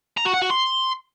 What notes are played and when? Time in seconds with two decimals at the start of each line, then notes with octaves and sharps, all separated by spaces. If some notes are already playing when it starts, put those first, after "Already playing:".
0.18 A#5
0.26 F#4
0.34 F#5
0.42 F#4
0.51 C6